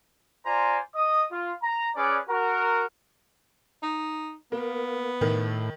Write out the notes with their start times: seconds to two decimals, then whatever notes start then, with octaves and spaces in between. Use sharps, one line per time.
0.45 F4 C5 D5 G#5 A#5
0.94 D#5 D#6
1.31 F4
1.63 A#5
1.95 C#4 G#4 B4 D5
2.28 F#4 A#4
3.83 D#4
4.52 A#3 B3
5.21 A2 D#3